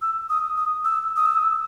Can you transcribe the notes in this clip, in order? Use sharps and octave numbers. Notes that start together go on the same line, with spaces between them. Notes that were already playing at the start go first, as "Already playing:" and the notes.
E6
D#6
D#6
E6
D#6
E6